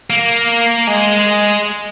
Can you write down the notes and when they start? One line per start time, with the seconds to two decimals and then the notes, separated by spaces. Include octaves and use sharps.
0.10 A#3
0.87 G#3